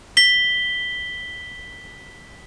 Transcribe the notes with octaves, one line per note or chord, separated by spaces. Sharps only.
B6 G7